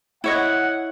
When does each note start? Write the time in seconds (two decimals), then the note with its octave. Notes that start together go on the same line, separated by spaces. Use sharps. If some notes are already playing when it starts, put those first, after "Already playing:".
0.24 E4 C#5 D#5 F#5